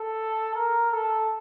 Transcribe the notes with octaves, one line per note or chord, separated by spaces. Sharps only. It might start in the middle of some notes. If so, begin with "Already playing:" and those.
Already playing: A4
A#4
A4